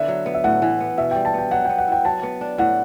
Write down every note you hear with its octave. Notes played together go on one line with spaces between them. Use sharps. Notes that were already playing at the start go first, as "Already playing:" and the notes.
Already playing: D3 B3 E4 E5
F#3
B3
E5
A2 F#5
E3
B3
B2 E5
G3 G5
A5
B3 G5
F#3 F#5
B3 G5
F#5
E4 G5
F#3 A5
B3
D4
A2 F#5